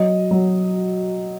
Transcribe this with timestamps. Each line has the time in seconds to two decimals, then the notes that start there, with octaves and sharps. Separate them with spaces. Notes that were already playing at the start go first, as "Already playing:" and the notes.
Already playing: F#3 D#5
0.31 F#3